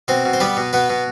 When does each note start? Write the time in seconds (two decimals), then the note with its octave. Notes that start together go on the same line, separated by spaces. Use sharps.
0.08 B2 C4 C5
0.25 B2
0.33 C5
0.40 G3 B3 B4
0.57 B2
0.73 B2 B3 B4
0.90 B2